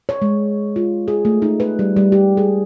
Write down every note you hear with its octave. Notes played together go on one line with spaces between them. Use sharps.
C#5
G#3
F4
G#4
A3
D#4
B4
G3
G3
G4
G#4